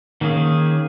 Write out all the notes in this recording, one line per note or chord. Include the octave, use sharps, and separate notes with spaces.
D#3 A#3 C#4 G#4